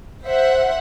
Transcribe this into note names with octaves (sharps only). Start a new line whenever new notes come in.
C5 E5 F#5